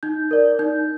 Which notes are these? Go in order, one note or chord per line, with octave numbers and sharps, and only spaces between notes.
D#4 G6
A#4 D5
D#4 G6